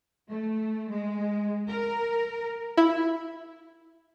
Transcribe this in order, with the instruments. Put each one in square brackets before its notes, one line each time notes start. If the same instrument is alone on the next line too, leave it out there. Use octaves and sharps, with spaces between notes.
[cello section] A3
G#3
A#4
[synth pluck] E4